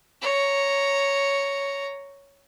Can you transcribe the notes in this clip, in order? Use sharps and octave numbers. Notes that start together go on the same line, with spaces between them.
C#5 A#5